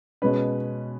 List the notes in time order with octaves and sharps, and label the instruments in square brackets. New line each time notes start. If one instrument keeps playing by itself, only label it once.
[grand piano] B2 G#3 C#4 B4